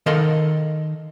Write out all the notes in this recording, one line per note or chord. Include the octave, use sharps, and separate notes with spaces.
D#3 A4 A#4 D#5 F5 C6